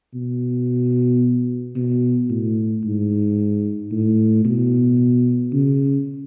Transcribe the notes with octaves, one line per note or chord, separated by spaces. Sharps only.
B2
B2
A2
G#2
A2
B2
C#3